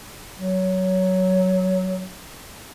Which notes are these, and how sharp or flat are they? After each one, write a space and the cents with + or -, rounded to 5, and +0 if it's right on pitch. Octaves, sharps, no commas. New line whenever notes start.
F#3 +10